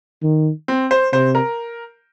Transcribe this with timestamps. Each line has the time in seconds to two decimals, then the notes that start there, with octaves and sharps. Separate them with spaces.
0.23 D#3
0.68 C4
0.91 C5
1.13 C3 C5
1.35 A#4